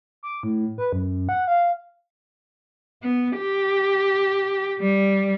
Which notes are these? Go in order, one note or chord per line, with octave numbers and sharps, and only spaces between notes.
D6
A2
B4
F#2
F#5
F5
B3
G4
G3